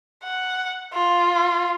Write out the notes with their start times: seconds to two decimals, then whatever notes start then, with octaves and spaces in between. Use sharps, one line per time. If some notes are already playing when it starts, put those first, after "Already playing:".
0.24 F#5
0.93 F4